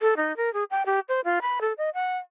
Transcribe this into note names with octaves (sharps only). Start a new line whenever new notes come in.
A4
D#4
A#4
G#4
G5
G4
C5
F4
B5
A4
D#5
F#5